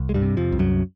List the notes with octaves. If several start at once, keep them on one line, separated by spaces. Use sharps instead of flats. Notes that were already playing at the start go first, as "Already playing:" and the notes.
Already playing: C2
G#3
G2 G3
C3
F2 F3
C2
F#2 F#3